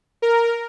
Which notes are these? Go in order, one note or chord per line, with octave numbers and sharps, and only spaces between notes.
A#4